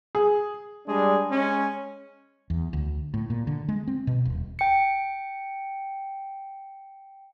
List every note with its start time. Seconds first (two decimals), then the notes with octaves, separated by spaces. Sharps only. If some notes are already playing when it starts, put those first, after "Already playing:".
0.15 G#4
0.87 G3 G#3 D4 G#4
1.30 G#3 C#4
2.50 E2
2.73 D2
3.14 A2
3.30 A#2
3.47 D3
3.69 G#3
3.88 C4
4.07 B2
4.25 D#1
4.59 G5 C#7